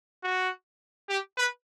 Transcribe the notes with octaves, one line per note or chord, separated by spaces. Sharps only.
F#4
G4
B4